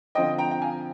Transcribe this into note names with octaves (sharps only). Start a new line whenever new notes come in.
D3 F3 C4 F4 D#5 G5
G5 A#5
G5
F5 G#5